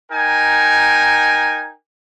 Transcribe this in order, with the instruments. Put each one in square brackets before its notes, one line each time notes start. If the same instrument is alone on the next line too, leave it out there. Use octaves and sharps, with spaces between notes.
[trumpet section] D#4 A#4 G5 G#5